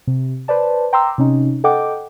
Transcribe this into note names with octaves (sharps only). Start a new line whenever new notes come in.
C3
B4 C5 D5 A5
G5 A#5 C6 D6 E6
C3 C#4 D#4
A4 D#5 F#5 G5 D6